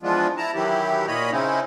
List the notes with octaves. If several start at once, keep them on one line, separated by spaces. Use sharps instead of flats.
E3 F3 G#3 B3 D4 F4
E4 A5 A#5
D#3 E3 F#3 E4 G4
A#2 A#3 C#5 D#5 B5
C#3 C4 C#4 D#4 E4